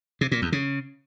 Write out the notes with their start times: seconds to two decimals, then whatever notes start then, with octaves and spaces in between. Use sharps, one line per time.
0.21 C3
0.32 A#2
0.42 E2
0.52 C#3